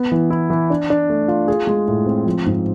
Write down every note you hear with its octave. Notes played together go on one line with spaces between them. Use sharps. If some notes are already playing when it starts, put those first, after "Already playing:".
Already playing: B3
E3
E4
E3
D4
D4
A3
F4
G#4
G#3
A2
C4
F3
G#2